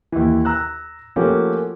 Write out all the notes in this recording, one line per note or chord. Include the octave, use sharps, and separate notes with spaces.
D#2 E3
A#5 E6 F#6
F3 A3 A#3 C#4 F#4 G4